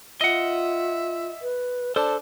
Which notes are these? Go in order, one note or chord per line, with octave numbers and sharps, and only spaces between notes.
F4 D#5 E5 F#5
B4
D4 A4 C5 A5